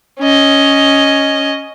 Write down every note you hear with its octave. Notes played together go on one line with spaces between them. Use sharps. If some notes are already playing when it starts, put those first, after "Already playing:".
C#4 D#5